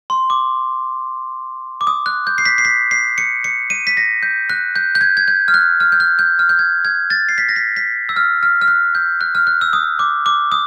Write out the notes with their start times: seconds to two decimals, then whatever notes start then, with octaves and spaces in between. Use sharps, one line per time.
0.10 C6
0.30 D6
1.81 D6
1.87 D#6
2.06 F#6
2.27 G6
2.38 C7
2.46 B6
2.58 C7
2.65 B6
2.91 C7
3.18 C#7
3.44 C#7
3.70 D#7
3.87 B6
3.97 A#6
4.23 G6
4.50 F#6
4.76 G6
4.95 G6
5.01 G#6
5.17 G#6
5.28 G6
5.48 F6
5.54 F#6
5.80 F6
5.92 G6
6.00 F#6
6.19 G6
6.39 F6
6.49 G6
6.59 G#6
6.85 G#6
7.10 A6
7.29 C7
7.38 B6
7.49 A#6
7.56 B6
7.76 B6
8.09 E6
8.16 F6
8.43 F6
8.61 F6
8.68 F#6
8.95 G6
9.21 F#6
9.35 F6
9.47 F#6
9.61 E6
9.73 D#6
9.99 D6
10.26 D6
10.52 D#6